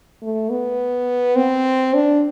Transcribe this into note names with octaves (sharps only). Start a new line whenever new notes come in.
A3
B3
C4
D4